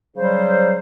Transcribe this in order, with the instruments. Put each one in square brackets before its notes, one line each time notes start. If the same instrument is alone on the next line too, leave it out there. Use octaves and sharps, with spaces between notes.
[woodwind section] C#3 F#3 G3 C5